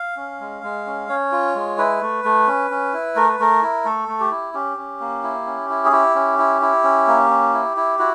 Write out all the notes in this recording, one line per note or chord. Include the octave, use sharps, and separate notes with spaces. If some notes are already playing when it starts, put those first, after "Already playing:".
Already playing: F5
C#4
G#3
G#3
C#4
C#4 C#5
F4
G#3
E4 B4
A3
A3
C#4
C#4
E4
A3 A#4
B4
A3 A#4
E4
A3 A4
A3
G4
E4
C#4 G4
C#4
A#3
E4
C#4
E4
G#4
E4 G4
C#4
E4
E4
C#4
A#3
C#4
E4
E4
E4 F#4